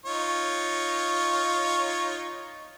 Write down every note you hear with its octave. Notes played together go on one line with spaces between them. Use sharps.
D#4 F4 C#5